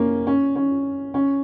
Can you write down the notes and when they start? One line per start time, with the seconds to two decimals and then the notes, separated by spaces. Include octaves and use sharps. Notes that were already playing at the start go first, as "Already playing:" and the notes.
Already playing: A#3 C#4
0.27 C#4
0.56 C#4
1.14 C#4